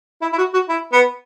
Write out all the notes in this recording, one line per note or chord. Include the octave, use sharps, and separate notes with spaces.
E4
E4
F#4
F#4
E4
B3